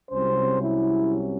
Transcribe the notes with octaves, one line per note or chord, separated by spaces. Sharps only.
C2 C3 F#3 C#4 C5
E4